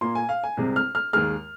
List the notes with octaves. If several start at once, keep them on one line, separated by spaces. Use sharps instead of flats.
A#2 A#3 C6
G#5
F5
G#5
C2 C3 G#3
F6
F6
D#2 D#3 G#3 F6